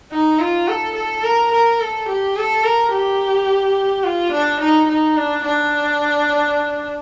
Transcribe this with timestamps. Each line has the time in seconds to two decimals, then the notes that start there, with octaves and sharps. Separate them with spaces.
0.12 D#4
0.40 F4
0.68 A4
0.95 A4
1.24 A#4
1.52 A#4
1.80 A4
2.08 G4
2.36 A4
2.64 A#4
2.93 G4
4.04 F4
4.32 D4
4.60 D#4
4.88 D#4
5.16 D4
5.45 D4